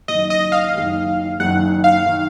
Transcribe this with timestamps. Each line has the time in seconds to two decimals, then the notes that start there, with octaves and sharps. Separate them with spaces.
0.08 F#1 F#2 D#3 D#5
0.30 D#5
0.52 F5
0.74 F#1 F#2 D#3
1.40 F#1 F#2 D#3 F#5
1.84 F5
2.06 D#3